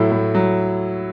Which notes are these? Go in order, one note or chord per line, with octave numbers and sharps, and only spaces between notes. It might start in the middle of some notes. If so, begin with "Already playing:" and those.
Already playing: A2 F#3 E4
A2
F#3